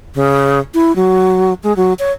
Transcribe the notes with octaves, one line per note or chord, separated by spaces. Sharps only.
C#3
E4
F#3
G#3
F#3
C#5